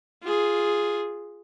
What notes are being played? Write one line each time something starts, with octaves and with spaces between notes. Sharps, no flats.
F4 G#4